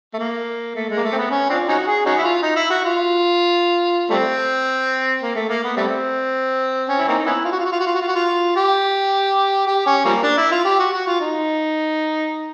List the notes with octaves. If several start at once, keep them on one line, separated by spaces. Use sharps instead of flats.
A3
A#3
A3
G#3
A#3
A3
C4
B3
C#4
C4 D4 F4
C#4 D#4 F#4
G#4
C#4 D#4 F#4
E4
F4
D#4
E4
F#4
F4
G3 A3 C4
A#3
A3
A#3
B3
G3 A3 C4
C#4
E4
A#3 C4 D#4
B3 C#4 E4
F4
F#4
F4
F#4
F4
F#4
F4
F#4
F4
F#4
F4
G4
G4
C#4
F3 G3 A#3
D4
E4
F4
G4
F#4
F#4
F4
D#4